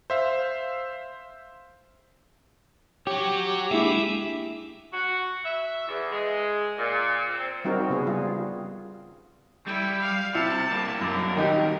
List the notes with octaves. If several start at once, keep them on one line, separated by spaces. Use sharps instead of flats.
C5 E5 F5
F#4 G4 C#5
G#3 A#3 D4 E4 G#4 E5
F#4
E5
E2
G#3
A#2
C4
G3 C4 D#4 F#4 A#4
C#3 B3 G#4
G3 F4
G3 E4
F5
C3 E4 A5
G3 A#3
F#2 F#3 A#4
D#3 D#4 G4